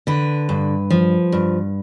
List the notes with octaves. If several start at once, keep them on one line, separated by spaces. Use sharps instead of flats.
D3 B4
G2
F3
G2